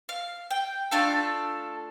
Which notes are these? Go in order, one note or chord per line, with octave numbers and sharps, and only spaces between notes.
F5
G5
A3 D4 F4 A4 F5